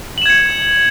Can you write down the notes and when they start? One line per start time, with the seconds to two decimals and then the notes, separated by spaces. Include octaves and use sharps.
0.18 F#7
0.22 E7
0.26 G#6
0.30 C#7